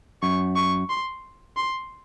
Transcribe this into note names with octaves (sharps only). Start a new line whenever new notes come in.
F#2 C#6
C#6
C6
C6